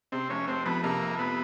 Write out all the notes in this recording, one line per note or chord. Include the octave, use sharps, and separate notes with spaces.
C3 C4
F1 C#4
F1 C4
F2 B3
C3 A#3
F1
F1 B3